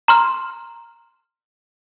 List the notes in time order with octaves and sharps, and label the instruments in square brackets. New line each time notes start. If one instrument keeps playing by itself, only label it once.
[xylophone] A#5 C6 F6